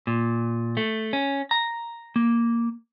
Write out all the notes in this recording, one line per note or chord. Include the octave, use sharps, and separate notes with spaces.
A#2
A3
C#4
A#5
A#3